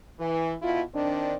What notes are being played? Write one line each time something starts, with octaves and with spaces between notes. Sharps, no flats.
E3
B2 E4 F4
D#3 C4 D4